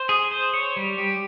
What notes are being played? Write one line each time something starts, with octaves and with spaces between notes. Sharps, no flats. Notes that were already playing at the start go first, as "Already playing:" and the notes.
Already playing: C5
G#4
C5
C#5
G3
G4